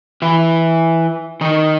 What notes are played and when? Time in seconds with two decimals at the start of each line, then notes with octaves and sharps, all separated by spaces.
0.22 E3 E4
1.41 D#3 D#4